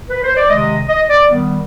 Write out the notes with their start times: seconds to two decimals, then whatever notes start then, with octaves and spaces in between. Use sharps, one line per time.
0.10 B4
0.24 C5
0.37 D5
0.50 C3 D#3 G#3 D#5
0.89 D#5
1.10 D5
1.29 D#3 G3 B3